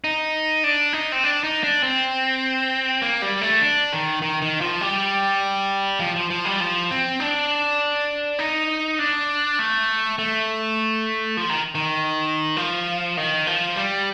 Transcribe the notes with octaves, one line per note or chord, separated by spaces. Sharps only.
D#4
D4
D#4
C4
D4
D#4
D4
C4
A#3
G3
A3
D4
D#3
D#3
D#3
F3
G3
F3
F3
F3
G3
F3
C4
D4
D#4
D4
A3
A3
F3
D#3
D#3
F3
D#3
F3
G3